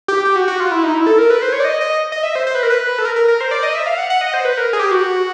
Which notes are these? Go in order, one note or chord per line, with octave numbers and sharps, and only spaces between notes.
G4
G4
F#4
F#4
F4
E4
D#4
E4
A4
A#4
B4
C5
C#5
D5
D#5
D#5
D#5
E5
C5
C5
B4
A#4
B4
A4
A#4
A#4
A#4
C5
D5
D#5
E5
F5
F#5
F#5
D#5
C5
B4
A#4
G#4
G4
F#4